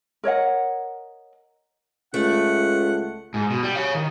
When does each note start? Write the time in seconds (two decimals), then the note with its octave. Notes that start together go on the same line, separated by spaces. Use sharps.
0.24 A#4 C#5 D#5 F#5
2.14 C#2 A3 F#5
3.34 G#2
3.50 B2
3.63 G3
3.75 C#5 F5
3.95 D#3